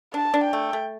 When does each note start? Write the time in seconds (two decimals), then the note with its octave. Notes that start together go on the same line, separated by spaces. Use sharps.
0.14 D4 A5
0.34 D4
0.44 G5
0.53 A3
0.73 A3